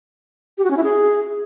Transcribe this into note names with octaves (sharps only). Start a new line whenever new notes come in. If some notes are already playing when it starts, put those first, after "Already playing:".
G4
F#4
C#4
E4
G#4